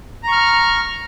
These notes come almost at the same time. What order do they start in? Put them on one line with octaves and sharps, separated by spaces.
A#5 C#6 F6